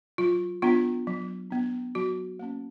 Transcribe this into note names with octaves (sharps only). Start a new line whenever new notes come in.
F#3 F4
B3 D4 F4
F#3
B3 D4
F#3 F#4
A#3 C#4